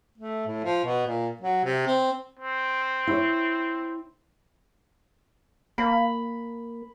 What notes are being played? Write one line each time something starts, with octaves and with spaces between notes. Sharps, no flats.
A3
A2
F3
B2
A#2
F#3
C3
C4
C4
E4 C#5
A#3 B5